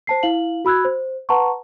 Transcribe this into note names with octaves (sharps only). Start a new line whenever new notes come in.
C5 A5 C7
E4 F5 F#7
F#4 B5 E6 F#6 G#6
C5
B4 F#5 A5 A#5 C6 C#6